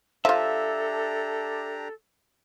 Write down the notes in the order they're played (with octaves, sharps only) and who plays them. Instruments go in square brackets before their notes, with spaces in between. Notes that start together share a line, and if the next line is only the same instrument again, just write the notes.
[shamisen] F3 F4 [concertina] D4 G4 A#5 [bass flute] A4 [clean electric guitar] E5